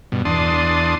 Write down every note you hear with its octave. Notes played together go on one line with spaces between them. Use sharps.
G2 B2
E2 D4 A5 C6 D#6